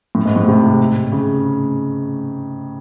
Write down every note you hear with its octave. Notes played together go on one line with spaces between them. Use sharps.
A2
G#2
A2
C3
C#3